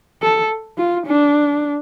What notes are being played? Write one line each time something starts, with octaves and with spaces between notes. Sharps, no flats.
A4
F4
D4